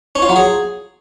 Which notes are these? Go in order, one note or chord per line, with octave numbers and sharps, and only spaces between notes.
C#4
F4
F#3
G#4